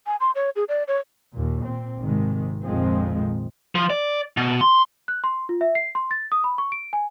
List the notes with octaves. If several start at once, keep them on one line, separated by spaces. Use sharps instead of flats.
G#5
C6
C#5
G#4
D5
C#5
D#2 A#2
A#2 C4
G#1 C3 D#3 G#3
A#1 F2 D#3 F3 G#3 C4
F3
D5
B2
C6
F#6
C6
F4
E5
C7
C6
A6
D#6
B5
C#6
D7
G#5